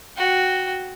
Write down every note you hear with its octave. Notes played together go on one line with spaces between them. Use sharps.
F#4 G5